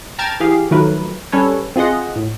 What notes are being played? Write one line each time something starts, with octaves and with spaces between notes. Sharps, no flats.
G5 A5 A#5 F6 G#6 A6
E3 G4 G#4 F5
D#3 F3 F#3 A3 A#4 B4
G3 C#4 A4 B4 C#5
C4 F4 G#4 D#5 F#5
A2